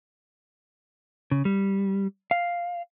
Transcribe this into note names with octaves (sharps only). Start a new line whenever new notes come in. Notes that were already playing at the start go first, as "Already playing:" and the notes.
C#3
G3
F5